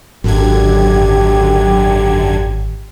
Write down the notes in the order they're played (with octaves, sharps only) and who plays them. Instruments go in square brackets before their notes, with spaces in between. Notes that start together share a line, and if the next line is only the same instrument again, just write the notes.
[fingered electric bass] G#1 [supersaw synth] F#2 D3 G#6 [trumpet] G4